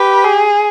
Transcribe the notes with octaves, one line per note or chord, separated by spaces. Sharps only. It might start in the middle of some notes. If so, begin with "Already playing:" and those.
Already playing: G4 B4
G#4